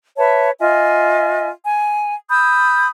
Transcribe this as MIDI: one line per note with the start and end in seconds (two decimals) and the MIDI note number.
0.17 0.50 71
0.17 0.50 73
0.17 0.50 76
0.17 0.50 81
0.60 1.49 65
0.60 1.49 75
0.60 1.49 76
0.60 1.49 80
1.64 2.16 80
2.30 2.87 83
2.30 2.87 87
2.30 2.87 88
2.30 2.87 91